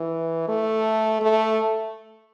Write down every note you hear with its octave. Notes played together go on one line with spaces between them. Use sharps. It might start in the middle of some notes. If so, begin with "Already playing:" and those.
Already playing: E3
A3
A3